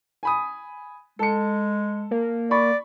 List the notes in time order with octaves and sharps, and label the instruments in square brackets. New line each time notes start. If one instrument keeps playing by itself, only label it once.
[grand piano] G#5 B5 D#6
[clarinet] G#3 [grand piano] A4 C#7
[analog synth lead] A#3
[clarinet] D5 [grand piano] B5 C#6